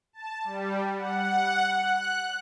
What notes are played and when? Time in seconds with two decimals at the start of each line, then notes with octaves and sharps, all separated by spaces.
0.13 A5
0.44 G3
0.96 F#5
1.68 F#6